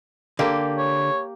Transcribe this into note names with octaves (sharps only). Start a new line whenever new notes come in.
D3 A#3 G4
C#5